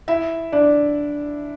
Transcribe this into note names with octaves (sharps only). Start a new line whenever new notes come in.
E4 E5
D4 D5